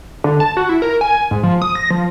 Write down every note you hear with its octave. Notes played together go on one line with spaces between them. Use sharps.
D3
A5
F#4
E4
A#4
G#5
G#2
F3
D#6
A#6
F3